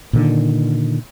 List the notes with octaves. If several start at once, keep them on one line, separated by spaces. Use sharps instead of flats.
A#2 D3 D#3